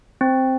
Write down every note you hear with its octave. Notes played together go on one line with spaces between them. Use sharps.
C4